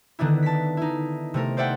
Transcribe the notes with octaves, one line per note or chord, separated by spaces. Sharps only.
D3 D#3 B3 D4 E4
A5 B6
D#4 E4
C3 A3 A#4
C5 D5 E5 F#5 G5